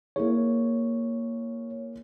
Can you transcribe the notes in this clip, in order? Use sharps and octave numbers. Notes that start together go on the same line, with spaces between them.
A#3 E4 G#4 C#5